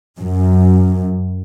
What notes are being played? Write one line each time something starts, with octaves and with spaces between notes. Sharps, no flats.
F#2